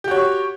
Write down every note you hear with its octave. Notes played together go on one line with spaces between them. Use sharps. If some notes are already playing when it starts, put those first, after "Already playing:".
F#4 G4 C#5